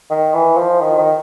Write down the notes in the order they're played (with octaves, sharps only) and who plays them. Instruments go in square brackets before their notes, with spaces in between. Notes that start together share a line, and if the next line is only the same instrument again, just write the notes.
[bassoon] D#3
E3
F3
D#3
D#3